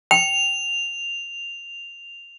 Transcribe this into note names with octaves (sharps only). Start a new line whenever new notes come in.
G5 F7